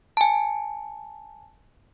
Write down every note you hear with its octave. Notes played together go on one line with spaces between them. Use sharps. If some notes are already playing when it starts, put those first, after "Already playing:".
G#5 A5